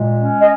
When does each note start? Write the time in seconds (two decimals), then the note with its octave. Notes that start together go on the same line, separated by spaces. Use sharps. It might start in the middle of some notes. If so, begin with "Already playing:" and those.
Already playing: A#2 G#3
0.17 C#4
0.41 D#5